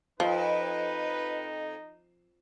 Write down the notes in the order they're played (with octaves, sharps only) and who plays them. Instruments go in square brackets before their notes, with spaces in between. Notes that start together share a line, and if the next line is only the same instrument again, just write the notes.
[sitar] F2 [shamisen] F3 [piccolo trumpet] D#4 [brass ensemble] B4